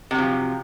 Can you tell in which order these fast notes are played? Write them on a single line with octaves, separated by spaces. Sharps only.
C3 F#3 F3